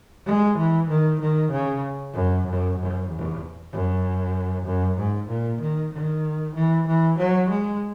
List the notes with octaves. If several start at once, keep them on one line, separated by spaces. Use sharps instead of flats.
G#3
E3
D#3
D#3
C#3
F#2
F#2
F#2
E2
F#2
F#2
G#2
A#2
D#3
D#3
E3
E3
F#3
G#3